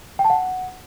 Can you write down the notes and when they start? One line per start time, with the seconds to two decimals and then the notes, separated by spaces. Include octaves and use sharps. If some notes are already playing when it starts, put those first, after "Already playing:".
0.19 G5
0.25 A5
0.30 F#5